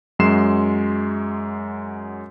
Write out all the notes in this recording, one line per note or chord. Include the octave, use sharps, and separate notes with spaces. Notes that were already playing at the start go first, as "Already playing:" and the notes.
F#2 F#3 G#3 C6 C7 E7